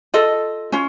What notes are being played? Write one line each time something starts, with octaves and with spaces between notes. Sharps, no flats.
F4 A4 D#5
C#4 F4